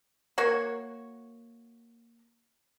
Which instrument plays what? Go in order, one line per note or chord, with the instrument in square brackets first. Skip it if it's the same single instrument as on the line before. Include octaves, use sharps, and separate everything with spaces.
[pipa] A#3 F#4 C#5